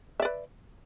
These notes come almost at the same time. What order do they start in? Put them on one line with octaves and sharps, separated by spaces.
E5 D5 B4